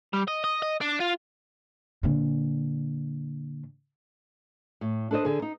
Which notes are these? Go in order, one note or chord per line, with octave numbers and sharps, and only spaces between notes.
G3
D#5
D#5
D#5
D4
F4
A#2 D3
A2
D4 A4 B4 C5 D#5
D3 G#4
D#4